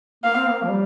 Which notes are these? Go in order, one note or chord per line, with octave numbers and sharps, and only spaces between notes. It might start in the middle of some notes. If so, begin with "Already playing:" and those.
A#3 F5
C4
A#3
F3
G3